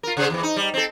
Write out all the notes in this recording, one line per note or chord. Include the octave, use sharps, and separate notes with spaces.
F4 A#4
C#3 G#4 C5
E2 E3
D#4
G3
C4 A4